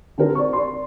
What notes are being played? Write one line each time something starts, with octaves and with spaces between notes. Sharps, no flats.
D3 C4 G4 A#4
D5 C#6
D5 C6